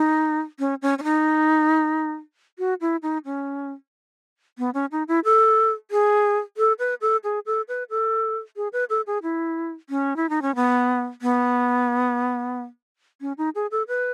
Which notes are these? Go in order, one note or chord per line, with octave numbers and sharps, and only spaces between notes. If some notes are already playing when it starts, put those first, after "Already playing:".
Already playing: D#4
C#4
C#4
C#4
D#4
F#4
E4
D#4
C#4
B3
C#4
D#4
E4
A4
G#4
A4
B4
A4
G#4
A4
B4
A4
G#4
B4
A4
G#4
E4
C#4
E4
D#4
C#4
B3
B3
C#4
D#4
G#4
A4
B4